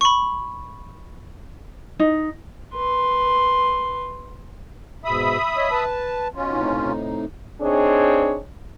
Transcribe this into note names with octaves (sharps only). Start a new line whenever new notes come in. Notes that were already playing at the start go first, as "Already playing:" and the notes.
B5 C#6
D#4
B4 C6
G#2 B2 E5 B5 D#6
C#5 D#5
B4 A5
B2 C#4 F4
A2 C3 D#4
C4 D4 D#4 G#4 C#5